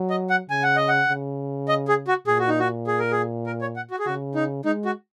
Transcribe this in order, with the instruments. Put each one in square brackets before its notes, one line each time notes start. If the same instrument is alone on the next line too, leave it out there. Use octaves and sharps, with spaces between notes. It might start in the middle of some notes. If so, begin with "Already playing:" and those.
Already playing: [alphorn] F#3
[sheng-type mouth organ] D#5
F#5
[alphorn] C#3 [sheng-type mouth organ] G#5
[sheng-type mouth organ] F#5
D#5
F#5
[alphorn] C#3
[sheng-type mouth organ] D#5
G#4
F#4
[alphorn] A#2 [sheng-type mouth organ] G#4
[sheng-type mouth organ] F#4
D#4
F#4
G#4
A#4
G#4
A#4
C#5
F#5
F#4
G#4
[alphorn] C#3 [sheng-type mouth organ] F#4
[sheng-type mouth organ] D#4
[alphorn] G#3 [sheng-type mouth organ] D#4
[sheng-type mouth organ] F#4